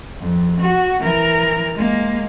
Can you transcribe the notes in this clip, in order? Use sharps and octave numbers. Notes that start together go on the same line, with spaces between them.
F2
F#4
E3 A#4
G#3 A#3